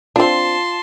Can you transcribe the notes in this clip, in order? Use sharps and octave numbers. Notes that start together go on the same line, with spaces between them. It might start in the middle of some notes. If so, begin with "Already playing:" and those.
C4 D4 F4 A5 C6